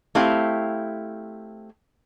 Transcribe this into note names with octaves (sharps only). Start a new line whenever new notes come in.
A3 C4 E4 G4 F5